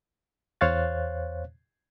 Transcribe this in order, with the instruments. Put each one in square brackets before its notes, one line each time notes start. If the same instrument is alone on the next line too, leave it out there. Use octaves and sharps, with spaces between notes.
[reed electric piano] E2 C5 C#5 F5 F#6 A6